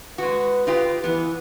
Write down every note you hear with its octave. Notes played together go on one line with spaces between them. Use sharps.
G#3 F#4 B4
D#4 F4 G4
E3 B3